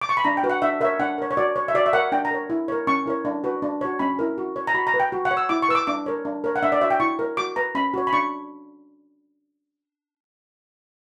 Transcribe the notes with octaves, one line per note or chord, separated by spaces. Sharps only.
D6
C#6
B5
D4 A#5
G5
F#4 B4
F#5
D4 E5
A#4 C#5 E5
D4 F#5
A#4 C#5
C#5
F#4 D5
C#5
E5
F#4 D5
E5
A#4 C#5 F#5
D4 G5
A#5
A#4 C#5
E4
A#4 C#5
C#4 C#6
E4 A#4 C#5
D4
F#4 B4
D4
F#4 C#5
C#4 B5
E4 A#4
F#4
C#5
A#5
F#4 B5
A#5
B4
G5
F#4
F#5
C#5
E6
E4 D6
C#6
B4 E6
D6
D4 D6
A#4 C#5
D4
A#4 C#5
F#5
D4 E5
D5
F#4 C#5 E5
G5
E4 C#6
A#4 C#5
F#4 D6
B4 A#5
C#4 B5
F#4 C#5
B5
D4 C#6